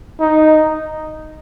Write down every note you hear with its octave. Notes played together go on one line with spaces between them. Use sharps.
D#4